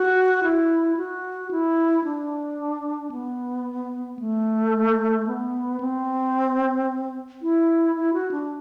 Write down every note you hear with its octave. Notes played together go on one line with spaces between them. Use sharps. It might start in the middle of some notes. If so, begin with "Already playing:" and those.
Already playing: F#4
E4
F#4
E4
D4
B3
A3
B3
C4
E4
E4
F#4
D4